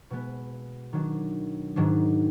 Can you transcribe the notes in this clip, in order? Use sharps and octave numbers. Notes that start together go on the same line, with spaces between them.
B2 G#3 B3
D#3 F#3 D4
G#2 D#3 F#3 D4